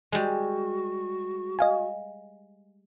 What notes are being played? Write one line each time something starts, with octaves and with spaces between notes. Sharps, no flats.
G3 G#3 F#4
D#5 F5 G#5